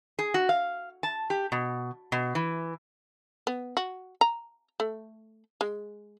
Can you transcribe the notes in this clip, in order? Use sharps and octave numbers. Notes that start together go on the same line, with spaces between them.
G#4
F#4
F5
A5
G4
B2
B2
E3
B3
F#4
A#5
A3
G#3